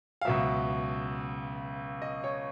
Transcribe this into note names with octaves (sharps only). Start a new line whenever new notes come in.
F5
C#2 B2 F#3 E5
D#5
C#5